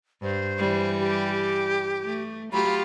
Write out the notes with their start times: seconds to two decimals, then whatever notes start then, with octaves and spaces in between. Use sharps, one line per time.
0.22 G2 C5
0.59 E3 G3
1.00 G4
2.04 A3
2.53 F#3 F4 G4 B5